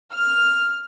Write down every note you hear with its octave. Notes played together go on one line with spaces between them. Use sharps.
F6